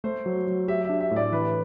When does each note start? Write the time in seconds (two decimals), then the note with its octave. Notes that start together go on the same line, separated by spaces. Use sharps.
0.04 A3 C5
0.26 F#3
0.47 F#3
0.68 G4 E5
0.84 D4 E5
1.00 E5
1.11 A2
1.16 D5
1.32 E3 B4